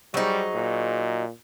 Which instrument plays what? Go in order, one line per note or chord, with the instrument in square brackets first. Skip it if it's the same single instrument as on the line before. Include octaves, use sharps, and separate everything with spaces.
[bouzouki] F#3 D#4 [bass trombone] G3 [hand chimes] G#4 C5 C#6
[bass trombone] A#2